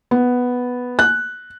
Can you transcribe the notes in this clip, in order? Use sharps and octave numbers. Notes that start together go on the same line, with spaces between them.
B3
F#6